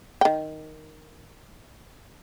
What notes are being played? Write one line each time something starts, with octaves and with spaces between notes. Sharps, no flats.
D#3 G5